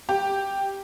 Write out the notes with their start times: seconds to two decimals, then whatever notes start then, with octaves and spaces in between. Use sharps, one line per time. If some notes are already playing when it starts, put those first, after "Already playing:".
0.09 G4